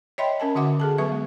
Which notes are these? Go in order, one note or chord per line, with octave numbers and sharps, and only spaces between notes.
C#5 D#5 E5 G5 B5 C6
C#4 A#4 G#5 A5
D3 F#4 E5 F#5 D6
G#4 A4 A5
F#3 B3 B4 E5 C#6
G#3